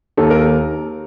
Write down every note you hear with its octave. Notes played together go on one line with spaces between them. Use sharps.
D#2 A4
A#4